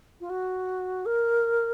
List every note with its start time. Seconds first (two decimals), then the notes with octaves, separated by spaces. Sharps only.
0.21 F4
0.30 F#4
1.06 A#4